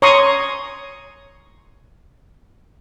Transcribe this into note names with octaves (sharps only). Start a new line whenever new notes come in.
C#5 A#5 C6 C#6 D#6